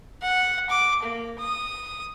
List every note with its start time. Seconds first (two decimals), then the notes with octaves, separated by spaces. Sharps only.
0.22 F#5
0.70 D6
1.03 A#3
1.39 D#6